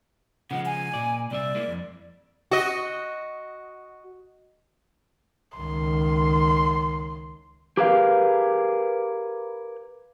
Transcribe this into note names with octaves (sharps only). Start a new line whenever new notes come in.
C#3 F3 G#3 F#5
G#5
A#2 D5
C2 C4 D5 E5
G#3 A#3 E4
F2
F#4 D#5
C#2 D#3 C6
G4 G#4 A#4 B4 E5 F5